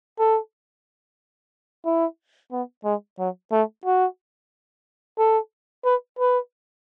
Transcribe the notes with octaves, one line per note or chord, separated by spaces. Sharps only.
A4
E4
B3
G#3
F#3
A3
F#4
A4
B4
B4